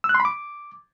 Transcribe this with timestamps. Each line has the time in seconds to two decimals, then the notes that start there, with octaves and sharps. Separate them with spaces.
0.04 E6
0.09 F#6
0.15 C6
0.20 B5
0.25 D6